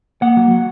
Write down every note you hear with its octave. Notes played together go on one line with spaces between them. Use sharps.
A#3 F#5
F#3
F#3